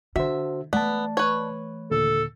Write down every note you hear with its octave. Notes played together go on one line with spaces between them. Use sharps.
D3 F#4 C5 E5
E3 A3 B3 D5 A5
B4 C#5
D#2 A#2 D3 A4